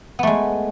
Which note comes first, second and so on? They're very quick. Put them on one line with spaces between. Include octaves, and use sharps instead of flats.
B3 A3 G#3